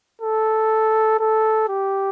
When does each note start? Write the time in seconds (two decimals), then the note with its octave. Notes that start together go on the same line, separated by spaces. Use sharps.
0.21 A4
1.20 A4
1.69 G4